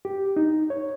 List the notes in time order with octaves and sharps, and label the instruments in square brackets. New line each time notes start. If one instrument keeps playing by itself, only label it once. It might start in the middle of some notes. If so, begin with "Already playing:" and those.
[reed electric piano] G4
D#4
C#5